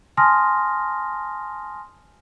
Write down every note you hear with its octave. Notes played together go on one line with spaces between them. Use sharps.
G#5 A5 C6 D#6 F6 A#6